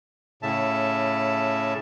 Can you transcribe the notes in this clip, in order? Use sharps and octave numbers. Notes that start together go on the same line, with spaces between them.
A2 C#3 E5 A5